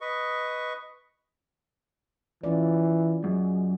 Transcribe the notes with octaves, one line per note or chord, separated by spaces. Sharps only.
B4 D#5 C#6
E3 C#4 F4 D5
F#2 G#3